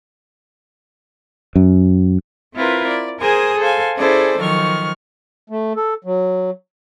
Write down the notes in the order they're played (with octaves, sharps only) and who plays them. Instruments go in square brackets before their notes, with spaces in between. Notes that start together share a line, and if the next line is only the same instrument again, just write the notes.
[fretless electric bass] F#2
[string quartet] C4 E4 F4 A#4 B4
D5
G#4 A#4 C5 G#5 D#6
A4 C5 F5 G#5
C#4 E4 G#4 A4 C5 D5
D#3 F3 F#3 C#6 F6
[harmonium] A3
A4
F#3